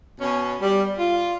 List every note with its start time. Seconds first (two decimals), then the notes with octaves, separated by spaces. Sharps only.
0.20 B2 C#4
0.61 G3
0.99 F4